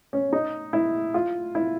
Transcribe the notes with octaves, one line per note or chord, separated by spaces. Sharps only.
C#4
D#4
E4
F4
E4